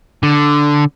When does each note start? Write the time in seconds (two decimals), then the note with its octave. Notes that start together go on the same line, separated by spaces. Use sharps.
0.23 D3